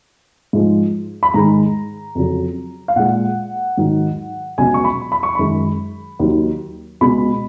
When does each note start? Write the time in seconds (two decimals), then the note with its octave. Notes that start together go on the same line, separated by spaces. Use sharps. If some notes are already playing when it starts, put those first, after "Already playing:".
0.53 G#2 F3 G#3
1.23 B5
1.34 G#2 D#3 G#3 A#5
2.15 F2 C#3 F#3
2.88 F5
2.96 A#2 G#3 F#5
3.77 G#2 D#3 F#3
4.58 C#2 B2 F#3 G#5
4.74 C#6
4.84 B5
5.12 B5
5.23 C#6
5.35 F#2 D#3 G#3 B5
6.19 D#2 D#3 F#3
7.01 C#2 B2 G#3 B5